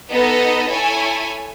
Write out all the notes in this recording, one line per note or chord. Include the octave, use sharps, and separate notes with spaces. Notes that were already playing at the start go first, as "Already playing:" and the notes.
B3 D#4 A4 D#5
E4 A4 C#5 G#5